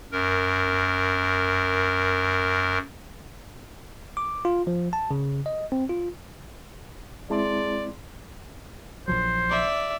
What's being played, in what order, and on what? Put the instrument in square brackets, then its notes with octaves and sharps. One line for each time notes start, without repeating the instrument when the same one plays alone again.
[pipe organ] F#2 A#4
[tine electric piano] D6
F4
F3
A5
C#3
D#5
C4
F4
[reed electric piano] G#3 C4 E4 [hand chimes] G#4 A5 C6 [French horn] D5
[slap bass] A#1 F3 F#3 [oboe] C5
[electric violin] D5 E5